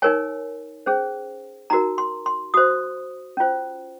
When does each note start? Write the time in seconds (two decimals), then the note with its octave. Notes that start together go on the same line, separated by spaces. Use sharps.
0.02 D#4 A#4 C#5 G#5
0.86 C#4 G#4 C5
1.70 D#4 F#4 A#4 A#5
1.98 C6
2.26 C6
2.54 F#4 C5 D#6
3.37 C#4 F4 C5